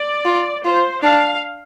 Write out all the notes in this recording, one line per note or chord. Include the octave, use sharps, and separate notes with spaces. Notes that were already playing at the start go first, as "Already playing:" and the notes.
Already playing: D5
F4
F4 C5
D4 F5